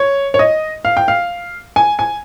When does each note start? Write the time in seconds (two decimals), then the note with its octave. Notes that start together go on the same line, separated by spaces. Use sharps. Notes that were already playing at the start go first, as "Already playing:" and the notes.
Already playing: C#5
0.34 C#5
0.39 D#5
0.85 F5
0.97 G5
1.08 F5
1.76 G#5
1.99 G#5